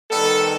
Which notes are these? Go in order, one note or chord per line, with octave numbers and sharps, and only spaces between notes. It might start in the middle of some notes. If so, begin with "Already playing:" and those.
D#3 G3 B3 A4